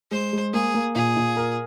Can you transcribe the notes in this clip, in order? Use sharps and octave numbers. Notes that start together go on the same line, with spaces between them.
G#3 C5
G#3
A#3 G#4
A#3
A#2 G#4
A#2
A#4